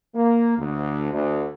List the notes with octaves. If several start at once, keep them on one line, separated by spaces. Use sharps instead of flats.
A#3
D2
D2